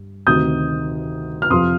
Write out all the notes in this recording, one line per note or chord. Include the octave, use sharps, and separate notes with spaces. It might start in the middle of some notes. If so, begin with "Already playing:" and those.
Already playing: G2
D2 C3 D#3 D#6 G6
F6
F2 C3 F3 C6 D#6